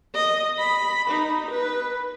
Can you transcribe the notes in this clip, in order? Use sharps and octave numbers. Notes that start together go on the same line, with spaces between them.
D#5
B5
D#4
B4